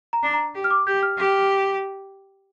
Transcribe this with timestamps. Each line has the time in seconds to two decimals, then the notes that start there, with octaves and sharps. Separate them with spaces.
0.13 A#5
0.23 D4
0.34 A#5
0.55 G4
0.64 F6
0.71 D6
0.87 G4 G6
1.03 F6
1.18 G4